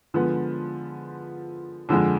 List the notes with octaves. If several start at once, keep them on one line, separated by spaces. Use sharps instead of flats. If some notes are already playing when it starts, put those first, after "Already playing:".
D3 F3 G#3 B3
F2 D3 F3 G#3